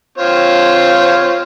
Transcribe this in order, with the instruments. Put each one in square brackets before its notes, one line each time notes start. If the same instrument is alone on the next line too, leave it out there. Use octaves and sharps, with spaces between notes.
[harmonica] C4 F4 C#5